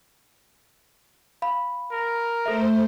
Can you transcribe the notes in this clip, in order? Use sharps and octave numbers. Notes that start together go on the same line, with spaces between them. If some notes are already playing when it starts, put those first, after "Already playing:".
F5 B5
A#4
A3 A4 C5 E5